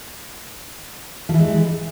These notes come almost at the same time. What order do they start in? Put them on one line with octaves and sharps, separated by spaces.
F3 E3 G#3